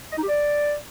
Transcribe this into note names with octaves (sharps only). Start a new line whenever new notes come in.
D#5
D#4
G4
D5